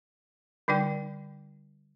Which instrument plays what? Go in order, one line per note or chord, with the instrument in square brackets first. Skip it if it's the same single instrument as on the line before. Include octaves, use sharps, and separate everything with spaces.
[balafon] D3 G3 D#4 G5